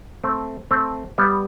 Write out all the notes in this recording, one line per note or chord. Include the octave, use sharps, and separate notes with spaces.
A3 C4
A3 C4
G3 B3